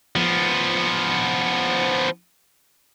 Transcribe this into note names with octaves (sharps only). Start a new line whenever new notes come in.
F3 B3